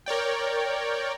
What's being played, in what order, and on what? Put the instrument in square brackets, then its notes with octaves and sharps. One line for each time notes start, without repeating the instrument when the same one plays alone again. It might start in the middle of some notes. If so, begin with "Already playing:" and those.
[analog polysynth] A#4 C#5 D5 G5